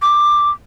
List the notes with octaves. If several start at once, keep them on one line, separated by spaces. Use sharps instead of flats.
D6